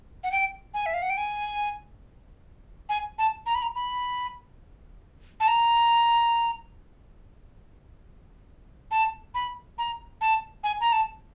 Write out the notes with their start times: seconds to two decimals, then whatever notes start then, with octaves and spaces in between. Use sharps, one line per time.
0.24 F#5
0.32 G5
0.74 G#5
0.86 E5
0.94 F5
1.02 F#5
1.10 G5
1.17 G#5
2.89 G#5
3.18 A5
3.46 A#5
3.55 B5
3.62 A#5
3.75 B5
5.40 A5
5.48 A#5
8.91 A5
9.34 B5
9.78 A#5
10.21 A5
10.64 G#5
10.81 A#5
10.93 A5